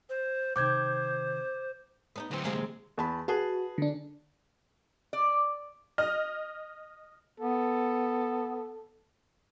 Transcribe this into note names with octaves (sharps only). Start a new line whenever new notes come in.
C5
C3 D#3 C5 D6 G6 G#6
B3 D4 D#4
D2 A2 E3 C4
C3 G#3 A#3
E2 A5 B5
F#4 G#4 B4 A5
D3 D4
D5
D#5 F6
B3 A4